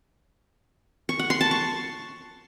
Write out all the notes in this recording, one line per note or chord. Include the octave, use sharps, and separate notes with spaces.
C#6
F#5
C6
A5
C#6